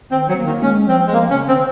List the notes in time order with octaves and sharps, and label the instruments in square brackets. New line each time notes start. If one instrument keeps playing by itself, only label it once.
[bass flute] D#3 [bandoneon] C4
[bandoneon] F#3
[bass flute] A#3
[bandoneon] D#3
[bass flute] G#3 [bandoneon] C#4
[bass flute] F3 [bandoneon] C4
[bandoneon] G#3
[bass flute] F3 [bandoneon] A#3
[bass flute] C#3 [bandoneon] C#4
[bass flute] D#3 [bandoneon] C4